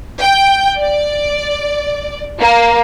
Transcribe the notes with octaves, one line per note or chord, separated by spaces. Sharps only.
G5
D5
A#3